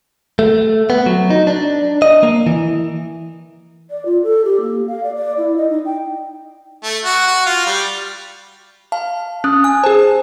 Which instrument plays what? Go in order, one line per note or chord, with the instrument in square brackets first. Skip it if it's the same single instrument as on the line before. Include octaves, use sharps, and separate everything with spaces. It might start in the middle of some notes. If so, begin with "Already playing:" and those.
[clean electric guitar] A3
B3
F#3
D#4
D4
D#5
A#3
E3
[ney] D5
F4
A4
G4
A#3
F5
D5
D5
E4
D#5
D#4
G5
[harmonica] A3
F#4
F#4
F4
G3
[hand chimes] F5 [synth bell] A5
[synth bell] C#4 [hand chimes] D#6 F#6
[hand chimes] G#5 [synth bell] D#6
[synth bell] G#4 C5 [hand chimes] A5